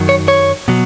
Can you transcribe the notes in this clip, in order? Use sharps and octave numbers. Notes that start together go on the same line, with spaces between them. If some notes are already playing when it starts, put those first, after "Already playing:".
Already playing: F#2 D#3 F#3
C#5
C#5
B2 F#3